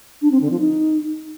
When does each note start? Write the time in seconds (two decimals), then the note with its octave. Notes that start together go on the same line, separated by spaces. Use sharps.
0.22 D4
0.31 C4
0.41 D3
0.50 F3
0.60 D#4